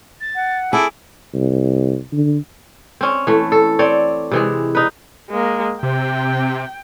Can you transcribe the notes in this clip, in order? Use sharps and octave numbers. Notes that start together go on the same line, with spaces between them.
A6
F#5
E4 G#4 A4 D6
C2
D3
C4 C#4
E3 A3
A4
C4 C#5 D5
C3 E3 G#3
D#4 B4
G#3 A#3
C3 G5